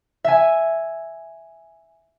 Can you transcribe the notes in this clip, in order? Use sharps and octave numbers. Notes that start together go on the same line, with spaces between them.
E5 G#5